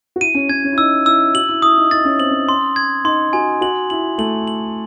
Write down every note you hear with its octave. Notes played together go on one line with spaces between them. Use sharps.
F#4
E4 D#7
C#4
C#4 G#6
C#4
E4
D#4 E6
E4 E6
F#4 F#7
E4
E4 D#6
D#4
D#4 A6
C#4
C4 F#7
C#4
C6
G#6
D#4 C6
F#4 G#5
F#4 F#7
E4 F#7
A3 F#7
F#7